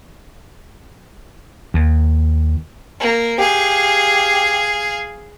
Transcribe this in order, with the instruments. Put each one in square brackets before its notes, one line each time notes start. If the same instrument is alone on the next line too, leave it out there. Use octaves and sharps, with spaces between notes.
[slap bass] D#2
[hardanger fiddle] A#3
[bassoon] G4 [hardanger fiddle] G#4 F5